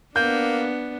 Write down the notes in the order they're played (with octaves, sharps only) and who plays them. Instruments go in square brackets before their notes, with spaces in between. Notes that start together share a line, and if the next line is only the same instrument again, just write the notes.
[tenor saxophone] A#3 [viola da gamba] B3 D4 [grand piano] G6